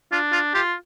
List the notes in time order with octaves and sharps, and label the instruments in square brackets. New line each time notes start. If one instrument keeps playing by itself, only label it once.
[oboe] D4 [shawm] F4
[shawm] F4
[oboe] F4 [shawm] G4